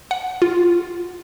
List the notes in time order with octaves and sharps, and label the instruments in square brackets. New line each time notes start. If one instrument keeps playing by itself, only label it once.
[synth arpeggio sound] F#5
F4